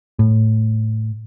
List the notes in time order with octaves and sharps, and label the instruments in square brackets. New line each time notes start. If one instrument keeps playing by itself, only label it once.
[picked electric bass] A2